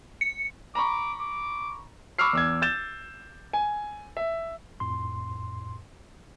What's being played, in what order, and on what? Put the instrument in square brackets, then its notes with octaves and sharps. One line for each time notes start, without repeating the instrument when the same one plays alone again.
[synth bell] C#7
[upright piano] A#5 B5 C#6 [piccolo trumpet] D6
[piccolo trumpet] D6
[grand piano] B5 C#6 D6 E6 F6 C7
E2 E6 G#6
G6 A6 E7
G#5
E5
[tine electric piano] F2 A2 C6